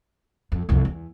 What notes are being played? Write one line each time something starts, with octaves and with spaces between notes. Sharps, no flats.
F2
C2 F2
E2